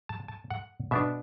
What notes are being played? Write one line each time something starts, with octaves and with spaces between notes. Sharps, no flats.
A5
A5
F#5
B2 B3 D4 E5